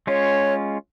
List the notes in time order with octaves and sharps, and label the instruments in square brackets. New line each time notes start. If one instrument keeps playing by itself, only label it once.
[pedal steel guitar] G#3 C#4 F4 [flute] C#5